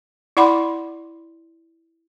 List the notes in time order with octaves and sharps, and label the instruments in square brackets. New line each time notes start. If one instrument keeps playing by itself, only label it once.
[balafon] E4 D5 F#5 B5 C6 D6